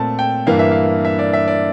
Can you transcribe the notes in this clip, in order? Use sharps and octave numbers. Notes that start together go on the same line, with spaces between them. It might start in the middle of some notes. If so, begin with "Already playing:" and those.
Already playing: A#2 A3 C4 A5
G5
G2 E3 A#3 F5
E5
F5
E5
D5
E5
D5